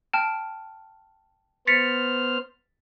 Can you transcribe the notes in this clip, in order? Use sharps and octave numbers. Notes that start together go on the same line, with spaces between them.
G5 A5 F6
B3 C5 F6 A6 B6 C#7